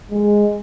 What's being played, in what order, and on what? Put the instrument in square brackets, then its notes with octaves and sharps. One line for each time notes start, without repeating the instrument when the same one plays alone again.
[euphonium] G#3